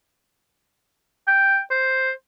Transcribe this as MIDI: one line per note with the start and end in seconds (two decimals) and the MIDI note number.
1.28 1.60 79
1.71 2.11 72